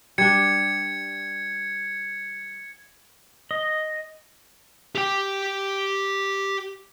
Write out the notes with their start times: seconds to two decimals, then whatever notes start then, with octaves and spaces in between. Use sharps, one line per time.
0.18 G3 D4 G#6 C#7
3.51 D#5
4.95 G4 G5